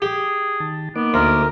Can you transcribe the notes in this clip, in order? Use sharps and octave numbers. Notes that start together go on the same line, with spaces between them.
G4 G#4
D#3 A5
A#3 B3 D#4 D6
D2 A#4